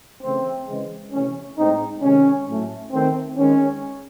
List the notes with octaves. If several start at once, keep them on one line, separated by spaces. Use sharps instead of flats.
C#3 E3 A3 C4
C#3 E3 G#3
C3 E3 A3 C#4
A2 G#3 C4 D#4
C3 D#3 G#3 C#4
A2 F#3 A3
D#3 A3 C4
D#3 G#3 C#4